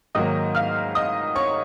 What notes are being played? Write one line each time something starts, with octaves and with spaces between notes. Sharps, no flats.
G#2 D#3 F#3 A#3 D#5 D#6
F5 F6
D#5 D#6
C#5 C#6